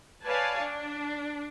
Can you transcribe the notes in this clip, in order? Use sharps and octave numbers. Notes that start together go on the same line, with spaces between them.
B4 C#5 D5 F5 G#5 A5
D4